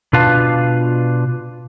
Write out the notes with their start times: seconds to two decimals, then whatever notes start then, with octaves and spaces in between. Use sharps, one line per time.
0.13 B2 D4 F4 B4 F5 A5